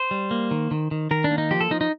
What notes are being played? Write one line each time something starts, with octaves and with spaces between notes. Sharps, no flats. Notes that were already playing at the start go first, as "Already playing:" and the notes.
Already playing: C5
G3
A#3
D#3
D#3
D#3
D#3 A#4
D4
A#3
D#4
F3 G4
A4
F3 D#4
D#4